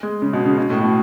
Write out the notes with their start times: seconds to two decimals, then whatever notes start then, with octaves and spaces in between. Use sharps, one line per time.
0.03 G#3
0.22 C#3
0.33 B2
0.45 C#3
0.58 B2
0.70 A2
0.81 B2